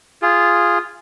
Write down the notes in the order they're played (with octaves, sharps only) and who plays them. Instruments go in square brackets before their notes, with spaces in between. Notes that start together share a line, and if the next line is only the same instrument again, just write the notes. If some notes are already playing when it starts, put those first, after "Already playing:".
[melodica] F4 G#4